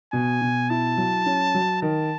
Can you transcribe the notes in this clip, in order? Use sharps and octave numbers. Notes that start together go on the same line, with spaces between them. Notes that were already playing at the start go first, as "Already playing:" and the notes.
B2 G#5
B2
E4 A5
F#3
C#4
F#3
D#3 A5